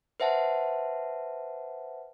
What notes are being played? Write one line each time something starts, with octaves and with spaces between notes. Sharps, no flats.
B4 C5 E5 F#5 A5